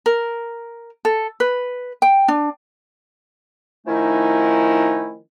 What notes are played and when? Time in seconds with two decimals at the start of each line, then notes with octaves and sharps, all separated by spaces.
0.06 A#4
1.05 A4
1.40 B4
2.02 G5
2.28 D4
3.86 D#3 F3 A3 C#4 D#4 E4